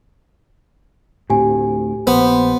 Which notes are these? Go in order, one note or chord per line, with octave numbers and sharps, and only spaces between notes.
D2 A2 C4 G4 G#5
A#1 B3 C5